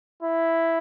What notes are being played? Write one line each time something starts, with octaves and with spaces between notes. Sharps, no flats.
E4